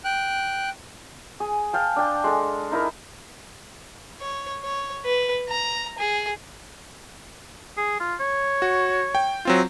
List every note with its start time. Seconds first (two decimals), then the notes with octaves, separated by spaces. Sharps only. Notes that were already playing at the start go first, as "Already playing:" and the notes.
0.04 G5 F#6
1.40 G#4
1.73 F5 G5 A5
1.96 D4 G5
2.24 G#3 A4
2.71 D#4 E4 A#4
4.20 C#5
4.63 C#5
5.05 B4
5.49 A#5
5.98 G#4
7.77 G#4
8.00 F4
8.20 C#5
8.62 F#4
9.15 G5
9.45 F#3 C4 F4